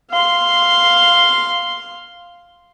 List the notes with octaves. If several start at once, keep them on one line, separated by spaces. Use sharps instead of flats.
F5 C6